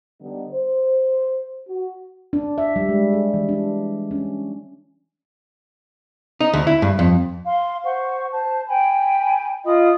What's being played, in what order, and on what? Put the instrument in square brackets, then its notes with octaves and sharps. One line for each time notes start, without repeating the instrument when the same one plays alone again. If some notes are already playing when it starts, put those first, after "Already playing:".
[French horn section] D3 G3 B3 D#4
C5
F#4
[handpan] D4
E5
G3
G#3
G#4
E3
D4
C#4
[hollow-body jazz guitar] D#4
D2
E4
G2
F2
[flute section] F5 C6
C5 F#5 C#6
C5 A5
G5 G#5 B5
F4 D#5 B5 D#6